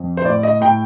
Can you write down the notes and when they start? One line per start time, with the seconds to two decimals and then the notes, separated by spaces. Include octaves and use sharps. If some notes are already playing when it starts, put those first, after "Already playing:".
Already playing: F2
0.17 C5
0.25 A2 D5
0.43 D#5
0.61 A2 G5